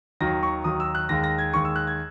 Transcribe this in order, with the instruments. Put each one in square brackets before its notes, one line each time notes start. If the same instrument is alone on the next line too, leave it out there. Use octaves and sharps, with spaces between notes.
[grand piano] D#2 D#3 F#3 A#6
C#6
D#2 D#3 F#3 D#6
E6
F#6
D#2 D#3 G#3 A#6
A#6
G#6
D#2 D#3 G#3 C#6
E6
F#6
G#6